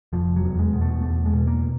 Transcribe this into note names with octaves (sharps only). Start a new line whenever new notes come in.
F1 F3
F#3
E2
G#3
B2
A3
E2 A3
G#3
B2
A#3